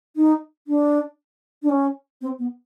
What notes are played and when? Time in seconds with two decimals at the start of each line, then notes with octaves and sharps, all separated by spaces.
0.16 D#4
0.67 D4
1.62 D4
1.69 C#4
2.21 C4
2.38 B3